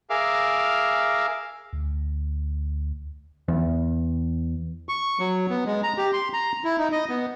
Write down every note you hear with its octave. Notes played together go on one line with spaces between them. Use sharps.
G#4 A#4 E5 F5 D6 F6
D2
E2
C#6
F#3
B3
G#3
A#5
G4
C6
A#5
E4
D#4
D#5
B3